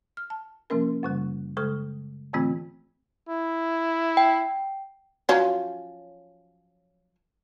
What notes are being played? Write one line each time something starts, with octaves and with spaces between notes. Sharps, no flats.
F6
A5
C3 F3 A#3 C#4 A#4
F#2 C#3 G3
C#3 G#3 A4 D#6 F6
A2 D3 E3 A3 C4 F4
E4
G5
F3 F#3 C#4